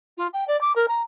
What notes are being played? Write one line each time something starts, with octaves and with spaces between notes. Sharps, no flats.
F4
G5
D5
D6
A#4
A#5